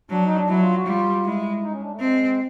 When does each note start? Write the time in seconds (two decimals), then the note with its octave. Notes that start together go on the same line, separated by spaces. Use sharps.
0.10 F#3 D4
0.24 D#4
0.35 D4
0.48 F#3 E4
0.61 F4
0.74 F#4
0.86 G3 F4
1.25 G#3 E4
1.62 D#4
1.72 C#4
1.82 D4
1.90 A3
2.00 G#3 C4